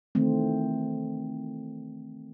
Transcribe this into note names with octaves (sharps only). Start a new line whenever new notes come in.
D#3 E3 A3 C4